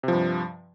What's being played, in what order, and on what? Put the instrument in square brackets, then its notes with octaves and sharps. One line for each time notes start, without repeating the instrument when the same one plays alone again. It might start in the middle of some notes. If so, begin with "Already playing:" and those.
[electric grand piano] C3
F3
G2